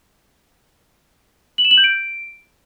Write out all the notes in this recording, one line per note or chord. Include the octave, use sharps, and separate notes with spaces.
F#7
E7
F#7
G6
D7